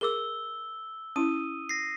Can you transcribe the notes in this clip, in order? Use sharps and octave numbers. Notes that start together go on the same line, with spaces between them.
G#4 A#4 D6 E6 G7
C#4 E4 D#6 D#7
A#6 C7